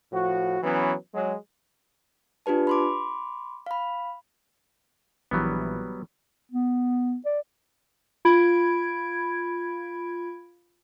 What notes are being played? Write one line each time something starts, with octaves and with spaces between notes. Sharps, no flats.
A2 F3 F#4
E3 F#3 B3 C#4
F#3 G#3
D4 F4 G4 B4 A5
B5 C6 D6
F5 B5
A#1 E3 F#3 G3 B3
B3
D5
F4 B5 G#6 D7